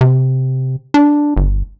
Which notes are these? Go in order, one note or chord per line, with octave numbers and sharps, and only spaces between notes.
C3
D4
G1